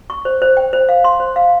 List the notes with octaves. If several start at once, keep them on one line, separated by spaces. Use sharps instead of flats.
C#6
C5
C5
G5
C5
F5
C6
C5
F5